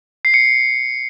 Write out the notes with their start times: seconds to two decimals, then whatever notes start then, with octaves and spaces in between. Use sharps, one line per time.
0.25 C7
0.34 C#7